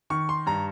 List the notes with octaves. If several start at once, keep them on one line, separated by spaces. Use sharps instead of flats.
D#3 C#6
C6
G2 A#5